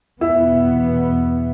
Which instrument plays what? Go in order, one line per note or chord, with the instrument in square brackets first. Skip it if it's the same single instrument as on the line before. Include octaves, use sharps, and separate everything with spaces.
[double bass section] E2 B2 B3 [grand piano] E4